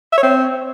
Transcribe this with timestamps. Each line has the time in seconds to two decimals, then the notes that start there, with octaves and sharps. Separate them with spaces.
0.13 E5
0.18 C#5
0.23 C4